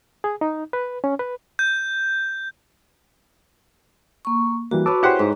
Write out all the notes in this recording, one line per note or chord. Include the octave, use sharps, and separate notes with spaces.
G#4
D#4
B4
C#4
B4
G6
A#3 C#6
E3 G3 A#3 F#4
B4 C#5 A5 D6 E6
E4 G4 G#4 C5 F#5
G#2